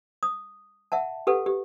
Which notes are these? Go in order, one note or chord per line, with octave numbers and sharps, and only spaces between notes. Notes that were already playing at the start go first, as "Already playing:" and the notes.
D#6
E5 F#5 A5
G4 A4 B4 F#5
G4